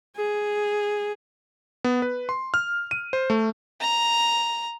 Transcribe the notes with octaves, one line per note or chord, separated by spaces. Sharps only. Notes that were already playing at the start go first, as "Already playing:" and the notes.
G#4
B3
B4
C6
F6
D#7
C5
A3
A#5